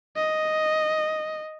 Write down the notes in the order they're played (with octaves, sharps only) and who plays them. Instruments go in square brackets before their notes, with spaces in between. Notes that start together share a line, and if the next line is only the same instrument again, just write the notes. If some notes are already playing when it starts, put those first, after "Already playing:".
[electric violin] D#5